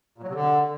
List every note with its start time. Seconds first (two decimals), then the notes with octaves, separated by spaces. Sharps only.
0.18 A#2
0.23 F#3
0.28 C3
0.33 D3